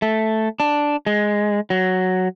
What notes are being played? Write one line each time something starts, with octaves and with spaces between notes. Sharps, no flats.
A3
D4
G#3
F#3